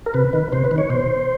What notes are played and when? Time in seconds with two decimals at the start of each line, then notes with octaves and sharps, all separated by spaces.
0.06 A#4
0.14 C3 B4
0.33 D#3
0.52 C3 C5
0.65 B4
0.71 D#3
0.78 C#5
0.90 B2 C5